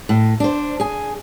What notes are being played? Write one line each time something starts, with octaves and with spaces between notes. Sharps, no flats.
A2
D4 C5
G#4 G#5